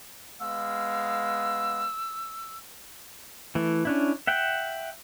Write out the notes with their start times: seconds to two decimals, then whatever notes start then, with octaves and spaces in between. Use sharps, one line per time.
0.40 G#3 B3 F5 E6
3.55 E3 A3 E4
3.85 C#4 D4 E4
4.27 E5 F#5 G5